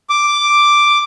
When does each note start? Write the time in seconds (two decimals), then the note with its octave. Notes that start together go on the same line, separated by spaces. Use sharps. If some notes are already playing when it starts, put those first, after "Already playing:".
0.09 D6